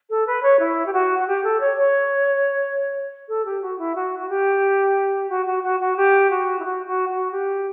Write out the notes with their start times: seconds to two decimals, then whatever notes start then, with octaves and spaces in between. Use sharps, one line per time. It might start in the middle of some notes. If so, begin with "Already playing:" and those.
0.10 A4
0.27 B4
0.43 C#5
0.59 E4
0.86 G4
0.93 F#4
1.19 F#4
1.27 G4
1.44 A4
1.60 C#5
1.77 C#5
3.28 A4
3.45 G4
3.62 F#4
3.78 E4
3.95 F#4
4.19 F#4
4.29 G4
5.29 F#4
5.46 F#4
5.63 F#4
5.80 F#4
5.96 G4
6.30 F#4
6.59 E4
6.64 F#4
6.86 F#4
7.09 F#4
7.31 G4